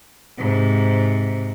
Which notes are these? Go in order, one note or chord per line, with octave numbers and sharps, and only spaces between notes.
G#2 C3